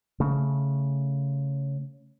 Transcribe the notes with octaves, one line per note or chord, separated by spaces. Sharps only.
C#3 A3